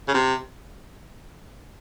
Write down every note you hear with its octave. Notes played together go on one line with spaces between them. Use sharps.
C#3
C3